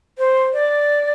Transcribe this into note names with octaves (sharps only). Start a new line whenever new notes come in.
C5
D5